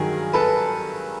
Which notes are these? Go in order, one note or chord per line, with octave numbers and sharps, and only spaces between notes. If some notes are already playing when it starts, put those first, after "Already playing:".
Already playing: G2 D#3 F#3 G#4 A#4
A4 B4